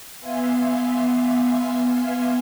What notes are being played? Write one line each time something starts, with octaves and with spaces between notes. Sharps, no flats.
B3 E5 F5 G#5 C6